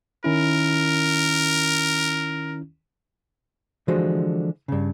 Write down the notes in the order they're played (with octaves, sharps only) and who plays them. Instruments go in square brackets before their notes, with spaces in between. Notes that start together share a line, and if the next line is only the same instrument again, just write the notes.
[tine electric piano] D#3 C#4 E4 [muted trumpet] A#4
[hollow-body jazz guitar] D3 E3 F3 G#3 F#4 C5
G2 C#3